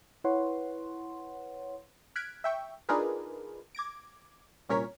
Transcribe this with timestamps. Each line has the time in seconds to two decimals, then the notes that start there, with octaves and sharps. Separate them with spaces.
0.24 E4 B4 C#5 F#5 C6
2.16 F6 F#6 G#6 B6 D7
2.44 E5 G5 C#6
2.89 D4 D#4 F4 G#4 A#4 B4
3.75 D6 G#6 A#6 D7
4.69 C2 A#2 C#4 A#4 C#5 B6